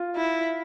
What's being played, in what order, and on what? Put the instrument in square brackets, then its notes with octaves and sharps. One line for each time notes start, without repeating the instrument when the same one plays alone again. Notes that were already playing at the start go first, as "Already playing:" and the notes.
Already playing: [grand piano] F4
[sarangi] E4